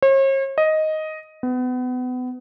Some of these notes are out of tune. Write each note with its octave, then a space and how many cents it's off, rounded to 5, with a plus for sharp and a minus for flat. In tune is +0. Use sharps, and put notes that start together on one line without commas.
C#5 -45
D#5 +5
B3 +30